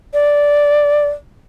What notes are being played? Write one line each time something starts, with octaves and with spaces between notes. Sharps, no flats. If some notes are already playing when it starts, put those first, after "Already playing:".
D5